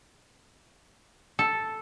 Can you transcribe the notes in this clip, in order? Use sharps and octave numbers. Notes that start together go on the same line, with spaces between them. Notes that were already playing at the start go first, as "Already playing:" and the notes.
A4